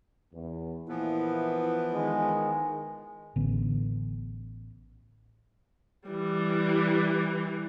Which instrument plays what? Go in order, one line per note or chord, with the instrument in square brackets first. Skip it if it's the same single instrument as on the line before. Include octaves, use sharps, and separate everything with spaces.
[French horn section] E2
[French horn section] A#2 E4 [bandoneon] E3 F3 B3
[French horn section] D#3 [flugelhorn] G#3
[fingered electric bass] A1 D3 B3
[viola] E3 G3